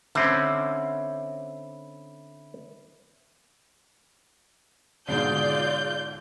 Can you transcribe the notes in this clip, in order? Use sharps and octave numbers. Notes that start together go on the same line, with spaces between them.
D3 C4 C#4 E4
G#2 B2 D3 F4 G#4 D5 G6